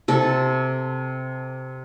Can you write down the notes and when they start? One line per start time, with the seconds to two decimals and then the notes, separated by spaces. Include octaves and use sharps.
0.08 C3 A4